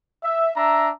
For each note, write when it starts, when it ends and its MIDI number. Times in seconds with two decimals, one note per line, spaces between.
0.24 0.51 76
0.55 0.89 62
0.55 0.89 76
0.55 0.89 82